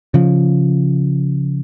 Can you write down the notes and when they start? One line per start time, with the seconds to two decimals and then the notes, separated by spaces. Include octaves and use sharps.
0.14 C#3 F3